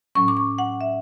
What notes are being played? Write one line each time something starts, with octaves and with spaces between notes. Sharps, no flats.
A2 F#3 C#4 C#6
D6
C#6
F#5
E5